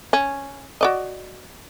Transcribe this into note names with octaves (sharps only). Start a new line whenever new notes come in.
C#4
F#4 D5 D#5